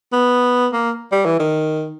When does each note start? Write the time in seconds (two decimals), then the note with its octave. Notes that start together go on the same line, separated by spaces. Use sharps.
0.13 B3
0.73 A#3
1.12 G3
1.25 E3
1.39 D#3